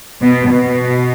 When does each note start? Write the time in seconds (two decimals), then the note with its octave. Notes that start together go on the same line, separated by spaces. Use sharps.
0.22 B2
0.51 B2